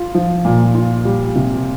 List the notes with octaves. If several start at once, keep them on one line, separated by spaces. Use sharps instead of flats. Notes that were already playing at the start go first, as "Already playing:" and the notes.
Already playing: F4
F3
A#2
F4
G3
C3